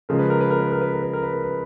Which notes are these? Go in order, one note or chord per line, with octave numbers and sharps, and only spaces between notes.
C#3 F3 G#3 A#4
B4
A#4
B4
A#4
B4
A#4
B4
A#4
B4
A#4
B4
A#4
B4